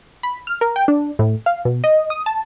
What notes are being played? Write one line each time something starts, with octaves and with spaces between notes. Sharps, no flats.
B5
F6
A#4
G5
D4
A2
F5
B2
D#5
D#6
A5